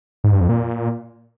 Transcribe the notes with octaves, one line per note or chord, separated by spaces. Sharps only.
G#2
G2
F2
A#2